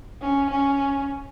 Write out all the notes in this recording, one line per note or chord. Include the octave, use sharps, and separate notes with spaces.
C#4
C#4